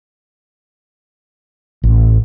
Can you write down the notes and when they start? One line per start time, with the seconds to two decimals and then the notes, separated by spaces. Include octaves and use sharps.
1.83 A1